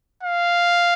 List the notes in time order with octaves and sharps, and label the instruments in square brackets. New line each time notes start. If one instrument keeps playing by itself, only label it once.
[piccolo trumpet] F5